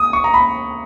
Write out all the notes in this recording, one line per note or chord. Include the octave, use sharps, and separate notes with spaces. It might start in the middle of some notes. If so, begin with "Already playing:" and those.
Already playing: D#6
C#6
A#5
B5